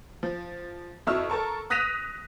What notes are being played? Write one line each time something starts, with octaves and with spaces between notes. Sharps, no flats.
F3
F2 E4 F#4 C#6 E6 F6
A4 A#4 A5 C#6
D#6 F#6 A#6 B6 D#7 F7